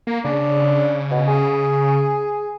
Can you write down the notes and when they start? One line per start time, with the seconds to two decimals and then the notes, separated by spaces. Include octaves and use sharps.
0.07 A#3
0.25 C#3 D4
1.11 B2
1.28 G#4